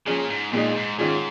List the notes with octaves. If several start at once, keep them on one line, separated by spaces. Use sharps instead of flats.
A#2 F3 C#4 G#4
G#2
F2 A#2 G#3 D#4
G#2
G#2 D#3 C#4 F4 G#4